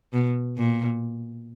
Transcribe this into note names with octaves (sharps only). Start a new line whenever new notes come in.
B2
A#2